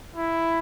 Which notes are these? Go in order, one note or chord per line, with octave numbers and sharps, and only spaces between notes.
E4